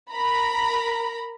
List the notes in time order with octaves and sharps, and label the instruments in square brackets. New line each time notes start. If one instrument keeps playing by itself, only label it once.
[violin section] A#4 A#5 B5